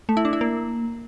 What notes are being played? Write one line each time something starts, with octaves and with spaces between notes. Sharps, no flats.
A3
E4
D4
E4
A#3